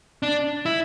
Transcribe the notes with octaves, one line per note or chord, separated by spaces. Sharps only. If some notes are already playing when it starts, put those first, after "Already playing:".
D4
E4